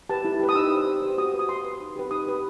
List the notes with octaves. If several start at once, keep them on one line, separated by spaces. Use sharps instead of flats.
G4 B4 A5
E4
G4 B4
D#6
D#4 E6
G4 C5
D#4
G4 C5
F#4 D#6
B4
D#6
F#4 C6
B4
D#4
G4 B4
D#4 D#6
G4 B4